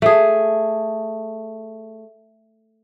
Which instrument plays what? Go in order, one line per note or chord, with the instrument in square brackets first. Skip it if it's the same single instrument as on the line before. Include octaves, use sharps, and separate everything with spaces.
[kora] A3 G#4